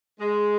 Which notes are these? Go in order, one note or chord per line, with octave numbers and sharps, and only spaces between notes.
G#3